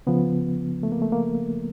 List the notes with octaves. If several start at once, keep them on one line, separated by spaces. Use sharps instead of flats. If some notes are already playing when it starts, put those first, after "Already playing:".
C#3 F3 B3
A3
A#3
A3
A#3